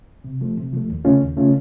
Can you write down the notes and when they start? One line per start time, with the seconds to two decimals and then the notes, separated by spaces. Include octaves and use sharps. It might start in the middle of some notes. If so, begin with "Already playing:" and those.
0.24 C3
0.41 F3 A3
0.57 C3
0.73 F3 A3
0.89 D#2
1.05 C#3 A3 C#4 F4
1.21 D#2
1.37 C#3 A3 C#4 F4